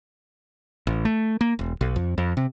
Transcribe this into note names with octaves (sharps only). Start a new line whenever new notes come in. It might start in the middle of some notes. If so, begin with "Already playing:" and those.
A1
A3
A#3
E1
B1
F2
F2
C3